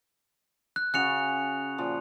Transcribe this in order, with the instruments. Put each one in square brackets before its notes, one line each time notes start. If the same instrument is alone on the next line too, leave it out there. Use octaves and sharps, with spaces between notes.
[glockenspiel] F#6
[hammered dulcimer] C#3 F#4 [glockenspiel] F#6 C#7 F7
[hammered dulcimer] A#2 F3